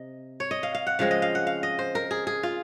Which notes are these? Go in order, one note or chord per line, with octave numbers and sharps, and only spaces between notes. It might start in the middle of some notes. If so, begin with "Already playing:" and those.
Already playing: C3 D#5
C#5
D#5
F5
F5
F#5
C#3 F3 G#3 C4 F5
D#5
F5
F#5
F5
D#5
C5
A#4
G#4
G#4
F4